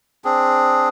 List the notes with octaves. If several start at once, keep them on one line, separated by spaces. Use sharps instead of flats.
C4 D4 G#4